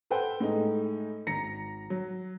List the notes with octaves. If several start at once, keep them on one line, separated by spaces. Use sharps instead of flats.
A4 B4 C5 F#5 G5
A2 G#3 D#4
G#1 A#5 A#6 C#7
F#3